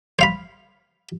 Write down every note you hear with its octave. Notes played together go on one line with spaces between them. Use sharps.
C5 F5 B5